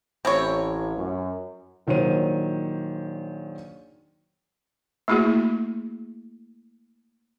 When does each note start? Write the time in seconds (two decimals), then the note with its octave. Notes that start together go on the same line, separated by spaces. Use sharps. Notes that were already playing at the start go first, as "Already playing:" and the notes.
0.25 A1 C4 E4 C#5
0.97 F#2
1.87 A#1 D#3 F#3 C5 C#5 D#7
5.08 A3 A#3 E4 F#4 G#4